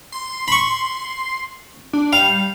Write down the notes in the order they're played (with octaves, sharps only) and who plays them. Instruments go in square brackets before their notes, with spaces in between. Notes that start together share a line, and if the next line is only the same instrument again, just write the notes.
[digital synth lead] C6
[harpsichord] B5 C#6
[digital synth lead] D4
[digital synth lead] G3 [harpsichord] F5